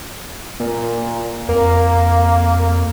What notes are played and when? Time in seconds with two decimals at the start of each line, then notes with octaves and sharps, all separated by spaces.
0.60 A#2
1.49 F2 A#3